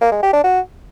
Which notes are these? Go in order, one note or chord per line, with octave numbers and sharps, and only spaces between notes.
A#3
G#3
G4
D4
F#4